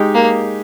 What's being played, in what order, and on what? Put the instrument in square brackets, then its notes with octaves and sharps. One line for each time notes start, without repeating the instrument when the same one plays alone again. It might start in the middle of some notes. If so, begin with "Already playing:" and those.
Already playing: [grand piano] G#3 D#4 G4
[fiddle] A#3